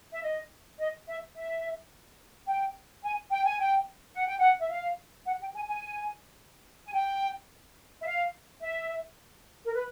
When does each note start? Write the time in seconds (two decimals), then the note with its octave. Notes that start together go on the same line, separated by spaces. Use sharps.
0.12 E5
0.23 D#5
0.79 D#5
1.07 E5
1.36 E5
2.47 G5
3.03 G#5
3.30 G5
3.45 G#5
3.59 G5
4.14 F#5
4.26 G5
4.39 F#5
4.59 E5
4.70 F5
5.26 F#5
5.40 G5
5.55 G#5
5.68 G#5
6.86 G#5
6.94 G5
8.01 E5
8.05 F5
8.62 E5
9.64 A#4
9.73 B4